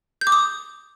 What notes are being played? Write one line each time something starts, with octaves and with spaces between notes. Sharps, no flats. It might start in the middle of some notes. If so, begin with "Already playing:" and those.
G6
D6
D#6